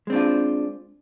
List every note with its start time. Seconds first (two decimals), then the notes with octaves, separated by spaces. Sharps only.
0.07 G#3
0.10 C4
0.13 D4
0.15 F4